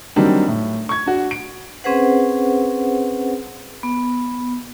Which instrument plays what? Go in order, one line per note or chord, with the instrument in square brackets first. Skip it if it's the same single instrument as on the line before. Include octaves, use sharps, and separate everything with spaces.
[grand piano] D#3 F#3 G3 A#3 C4 D4
A2
C#6 G#6
D4 F#4
D7
[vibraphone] C4 C#4 G#4 B4 C5 F#5
B3